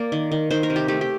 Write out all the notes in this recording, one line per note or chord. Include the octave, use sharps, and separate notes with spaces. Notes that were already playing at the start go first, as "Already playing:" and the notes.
Already playing: A#3 D5
D#3
D#3
D#3 C5
A#4
C3
G4
A3 G4
G4